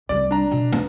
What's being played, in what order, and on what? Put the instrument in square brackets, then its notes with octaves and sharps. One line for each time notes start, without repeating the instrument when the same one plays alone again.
[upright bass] C2 G3 [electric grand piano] D5
[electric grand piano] D4 A#5
[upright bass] B2
B3